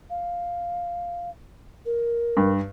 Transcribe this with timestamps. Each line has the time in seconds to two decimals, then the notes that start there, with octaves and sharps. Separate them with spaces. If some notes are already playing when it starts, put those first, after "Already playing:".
0.10 F5
1.86 A#4
2.37 G2